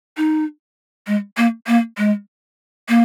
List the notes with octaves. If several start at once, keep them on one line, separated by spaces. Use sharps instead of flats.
D#4
G#3
A#3
A#3
G#3
A#3